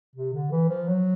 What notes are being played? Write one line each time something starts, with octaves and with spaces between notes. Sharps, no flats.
C3
D3
E3
F3
F#3